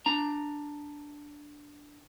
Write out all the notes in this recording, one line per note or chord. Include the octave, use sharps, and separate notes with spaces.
D4 A#5